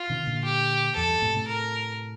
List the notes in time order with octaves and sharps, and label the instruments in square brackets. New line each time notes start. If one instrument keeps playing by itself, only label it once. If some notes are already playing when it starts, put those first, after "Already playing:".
Already playing: [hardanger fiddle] F4
[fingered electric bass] C3 D#3
A#2 D3
[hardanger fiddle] G4
[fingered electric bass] F2 [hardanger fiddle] A4
[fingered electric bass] G2
A2 C3
A2 C3
[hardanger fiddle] A#4